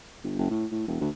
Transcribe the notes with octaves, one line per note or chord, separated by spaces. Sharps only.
G1
F#1
A2
A2
E1
D2